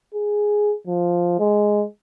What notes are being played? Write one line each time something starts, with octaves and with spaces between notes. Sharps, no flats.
G#4
F3
G#3